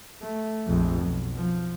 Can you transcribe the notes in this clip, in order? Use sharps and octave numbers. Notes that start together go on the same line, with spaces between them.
A3
A#1 F2
B1
F3